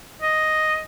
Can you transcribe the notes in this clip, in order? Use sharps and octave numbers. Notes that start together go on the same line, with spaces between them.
D#5